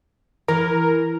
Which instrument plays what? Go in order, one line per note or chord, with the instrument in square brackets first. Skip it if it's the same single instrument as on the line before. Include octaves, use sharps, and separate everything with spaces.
[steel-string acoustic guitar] E3 [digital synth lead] A#4